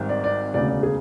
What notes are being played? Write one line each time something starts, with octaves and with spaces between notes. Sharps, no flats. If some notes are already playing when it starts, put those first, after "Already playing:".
Already playing: G#1 G#2 G3 C4
D5
D5
E1 D2 C#3 D5
D5
G#4